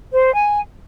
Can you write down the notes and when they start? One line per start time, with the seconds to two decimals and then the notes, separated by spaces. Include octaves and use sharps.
0.12 C5
0.34 G#5